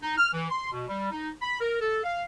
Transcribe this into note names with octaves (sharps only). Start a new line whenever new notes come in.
D#4
F6
E3
C6
B2
G3
D#4
B5
A#4
A4
F5